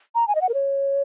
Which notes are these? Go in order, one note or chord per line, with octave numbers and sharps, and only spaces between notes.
A#5
G#5
D#5
F#5
A#4
C#5